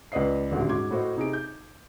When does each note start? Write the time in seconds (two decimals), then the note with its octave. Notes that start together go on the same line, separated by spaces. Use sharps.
0.12 C#2 B4 D5 D#5 C7
0.51 D#1 A1 D2
0.69 G#2 F#4 C6 D6 G#6
0.91 A2 F#4 C5 D#5
1.17 C3 D#4 G#4 D7
1.33 G6